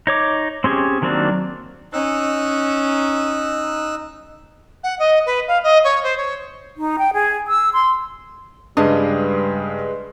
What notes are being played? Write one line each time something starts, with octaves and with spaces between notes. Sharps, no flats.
D#4 C#5 D6
C4 C#4 G4 G#4
D#3 F#3 A#3 C4 D4
C#4 D#4 E6 F#6
F#5
D#5
B4
F5
D#5
C#5
C5
C#5
D#4
G5
G#4
E6
C6
G2 C#3 G3 G#3 D4 B4 D#5 D#6